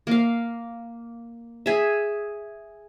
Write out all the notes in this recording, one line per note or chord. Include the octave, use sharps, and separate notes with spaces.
A#3 F5
G#4 E5